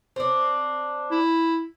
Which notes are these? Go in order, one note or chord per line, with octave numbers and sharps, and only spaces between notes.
C4 D4
E4